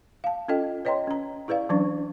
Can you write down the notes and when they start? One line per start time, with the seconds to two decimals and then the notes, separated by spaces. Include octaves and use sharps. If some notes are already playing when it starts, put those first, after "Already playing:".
0.24 F5 A5
0.48 C#4 F4 A4 D#5 G5
0.85 B4 C#5 D#5 G5 A#5 C6
1.07 C#4 A#5
1.48 E4 G#4 B4 D5 F5
1.69 E3 F#3 C#4 D4 D5 C#6